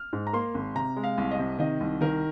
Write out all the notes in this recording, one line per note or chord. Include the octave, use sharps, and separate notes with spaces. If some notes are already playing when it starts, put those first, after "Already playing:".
Already playing: F6
G#2
A#5
A#3 C6
G#1
C3 A#5
G#3
F5
C2
D#5
C3
D#3 D#5
C2
D#3 A#4